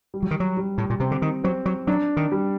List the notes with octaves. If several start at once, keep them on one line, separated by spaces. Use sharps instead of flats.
G3
F#3
D#3
F#3
G3
A2
A#2
C3 C4
D3
D#3
F#3 C4
F#3
F#3 D4
D#3
G3